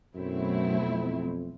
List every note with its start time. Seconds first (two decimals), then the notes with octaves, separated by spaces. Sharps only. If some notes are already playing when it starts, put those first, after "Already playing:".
0.14 F#2 B2 F#3 A3 C4 E4
0.81 F2